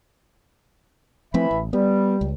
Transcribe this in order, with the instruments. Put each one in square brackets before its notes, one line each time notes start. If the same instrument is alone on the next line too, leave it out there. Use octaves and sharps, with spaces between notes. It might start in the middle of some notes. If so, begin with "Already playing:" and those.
[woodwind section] E3 E5 B5 [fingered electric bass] F3 A3 C4
[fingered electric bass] A1
[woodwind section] G3 [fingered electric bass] B3
[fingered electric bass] C#2